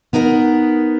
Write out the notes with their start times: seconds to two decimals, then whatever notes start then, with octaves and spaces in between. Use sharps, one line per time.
0.13 B3 D#4 A#4 F#5